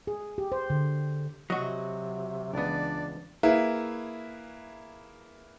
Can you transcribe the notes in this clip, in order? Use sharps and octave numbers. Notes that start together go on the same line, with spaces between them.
G#4
G4
C5
D3
C3 F#3 F#4 D#5
C#2 E3 B3 D4 D5
A#3 E4 G#4 B4 E5